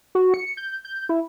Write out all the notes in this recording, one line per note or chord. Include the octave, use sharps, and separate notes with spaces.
F#4
C#7
G6
G6
E4